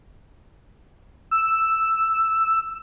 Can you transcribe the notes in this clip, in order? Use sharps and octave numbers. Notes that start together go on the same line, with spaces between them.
E6